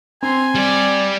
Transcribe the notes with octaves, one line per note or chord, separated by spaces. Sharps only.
C4 G#5 A#5 C6
G3 G4 D5